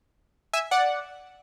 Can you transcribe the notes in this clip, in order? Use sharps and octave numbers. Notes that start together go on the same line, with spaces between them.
E5 G#5
D5 F#5